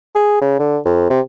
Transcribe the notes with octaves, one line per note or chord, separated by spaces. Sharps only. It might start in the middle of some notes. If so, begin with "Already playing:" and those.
G#4
C#3
D3
F2
C3